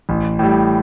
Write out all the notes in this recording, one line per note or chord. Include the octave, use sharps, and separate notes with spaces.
A1
A2 G3